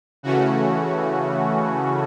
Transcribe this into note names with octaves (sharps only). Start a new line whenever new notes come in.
C#3 E3 A3 C#4 F#4